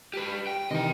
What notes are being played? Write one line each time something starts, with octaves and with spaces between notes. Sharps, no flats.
G4 B4
G5
C3 D#3 E3 D#5 G5